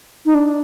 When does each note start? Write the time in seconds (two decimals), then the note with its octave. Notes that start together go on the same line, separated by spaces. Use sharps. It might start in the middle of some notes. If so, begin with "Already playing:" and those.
0.26 D#4
0.34 D4